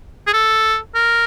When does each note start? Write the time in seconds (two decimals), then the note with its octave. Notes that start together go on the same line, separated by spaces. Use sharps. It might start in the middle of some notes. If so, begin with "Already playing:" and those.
0.27 G#4
0.33 A4
0.95 A#4